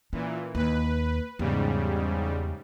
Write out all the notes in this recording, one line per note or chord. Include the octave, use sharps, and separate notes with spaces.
A#2 E3 C#4
D#2 B4
E2 G#2 C#3 G3